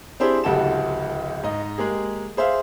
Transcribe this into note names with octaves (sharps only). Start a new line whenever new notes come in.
C4 D4 E4 G4 G#4 C5
D1 C#2 F#4 G4 A4 E7
G#2 D#5
G#3 A#3 G4 G#4
G#4 C5 E5 F5